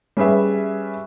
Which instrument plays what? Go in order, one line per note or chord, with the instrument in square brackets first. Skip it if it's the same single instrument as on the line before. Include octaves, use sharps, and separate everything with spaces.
[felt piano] G3 C#4 G#4 B4 E5